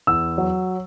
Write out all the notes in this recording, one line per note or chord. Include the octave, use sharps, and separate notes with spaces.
E2 E6
F#3